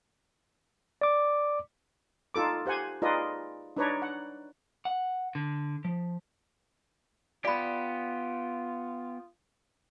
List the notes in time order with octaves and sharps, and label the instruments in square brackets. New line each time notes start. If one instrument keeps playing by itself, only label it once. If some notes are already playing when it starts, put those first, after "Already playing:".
[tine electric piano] D5 D6
[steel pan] D#4 F4 A4 D6
G4 C5 F#5 G#5
D#4 F4 G#4 B4 D5 D#5
D4 D#4 B4 C#5 D5 A#5
F#5
[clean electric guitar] F#5
D3
F3
[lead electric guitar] B3 G4 [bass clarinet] F4 [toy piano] D5 B5